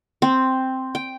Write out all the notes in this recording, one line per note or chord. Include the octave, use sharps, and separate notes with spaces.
C4
G5